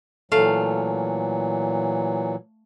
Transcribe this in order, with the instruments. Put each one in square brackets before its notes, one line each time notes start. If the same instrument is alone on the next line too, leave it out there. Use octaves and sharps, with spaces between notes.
[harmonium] A#2 E3 F#3 [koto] A3 F5